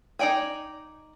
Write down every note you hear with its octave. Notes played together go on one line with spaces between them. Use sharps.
D#4 G#4 D5 G5 G#5